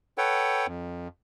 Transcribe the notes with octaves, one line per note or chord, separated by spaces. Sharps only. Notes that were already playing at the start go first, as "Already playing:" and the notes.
A4 B4 C#5 F#5 G5
F2